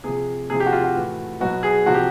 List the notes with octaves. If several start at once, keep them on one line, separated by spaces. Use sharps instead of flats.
C3 F3 G#4
C3 F3 G#4
G4
F#4
F4
F#4
A2 E3
B2 F#3 F#4
G#4
C3 F3 F#4
G4